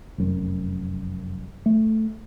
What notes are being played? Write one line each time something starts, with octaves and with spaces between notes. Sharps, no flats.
F1 F#2
A3